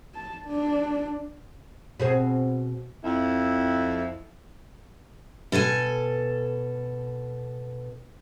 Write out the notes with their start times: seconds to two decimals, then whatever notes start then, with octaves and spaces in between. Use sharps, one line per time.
0.15 A5
0.46 D4
2.00 B2 C4 G#4
3.04 F2 E4
5.52 B2 A4 E5 G#5